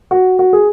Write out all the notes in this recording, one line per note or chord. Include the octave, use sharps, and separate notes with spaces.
F#4
F#4
G#4